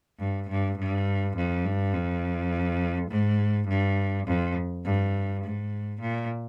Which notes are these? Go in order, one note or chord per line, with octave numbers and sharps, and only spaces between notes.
G2
G2
G2
F2
G2
F2
G#2
G2
F2
G2
G#2
A#2